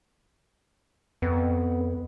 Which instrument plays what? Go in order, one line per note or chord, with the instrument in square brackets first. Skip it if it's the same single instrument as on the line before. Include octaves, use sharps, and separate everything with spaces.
[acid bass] F2 [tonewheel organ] B3